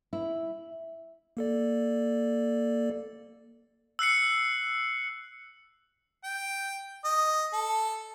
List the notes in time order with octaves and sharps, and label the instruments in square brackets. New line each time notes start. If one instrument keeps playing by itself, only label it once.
[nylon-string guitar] E4
[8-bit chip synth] A#3 A4 D5
[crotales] E6 F#6 C7 C#7
[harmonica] G5
D#5
A4